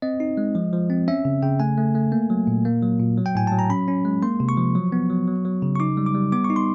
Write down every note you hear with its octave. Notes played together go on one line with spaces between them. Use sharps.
C4 D#5
D#4
G#3
F3
F3
C4
C#4 E5
C#3
C#3 G5
A3 G#5
A3
A3
A#3
F#3
A#2
A#3
F#3
A#2
F#3
G5
A2 G#5
F#3 A5
A#5
C#4 B5
C#4
G#3
A#3 C6
C3
C#6
F3
F#3
B3
F#3
F#3
F#3
C#3
C#6
D#4 D6
G3
D6
G3
B3 D6
C#6
D#4
C6